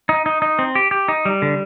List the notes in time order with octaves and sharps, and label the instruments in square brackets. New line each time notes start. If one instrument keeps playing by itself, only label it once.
[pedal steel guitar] D#4
D#4
D#4
C4
G4
G4
D#4
G3
D3